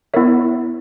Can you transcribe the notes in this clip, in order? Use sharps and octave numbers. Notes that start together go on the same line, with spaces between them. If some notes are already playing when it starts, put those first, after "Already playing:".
B3 E4 A#4 C#5 E5